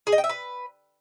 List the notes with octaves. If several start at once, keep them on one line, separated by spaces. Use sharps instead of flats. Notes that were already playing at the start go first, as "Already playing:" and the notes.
G#4
D#5
G5
E5
B4